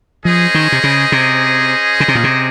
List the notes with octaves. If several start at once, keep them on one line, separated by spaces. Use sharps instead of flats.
F3 C#4 G#4 C5 D#5
D#3
C3
C#3
C3
C#3
C3
A#2
C3